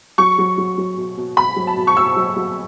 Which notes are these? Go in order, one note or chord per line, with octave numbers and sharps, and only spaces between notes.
F#3 C#6
F#3
F#3
F#3
B2
B2
B2 B5
F#3
A5
B2
C#6
B2 E6
F#3
F#3